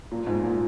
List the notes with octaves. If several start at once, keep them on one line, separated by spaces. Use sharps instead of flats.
A#2
G#2
A#2